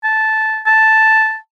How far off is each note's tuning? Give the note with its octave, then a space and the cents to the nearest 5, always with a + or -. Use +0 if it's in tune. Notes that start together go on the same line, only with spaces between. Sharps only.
A5 -10
A5 +0